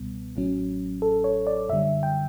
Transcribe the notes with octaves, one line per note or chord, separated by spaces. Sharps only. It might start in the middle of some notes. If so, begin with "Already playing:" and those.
Already playing: C#2 B2 G3 B3
A1 A2 F#3 C#4
A4
C#5
D5
F#2 D3 G3 E5
G5